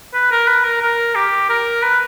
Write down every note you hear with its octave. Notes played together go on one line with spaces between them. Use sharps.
B4
A#4
B4
A#4
A#4
G4
A#4
B4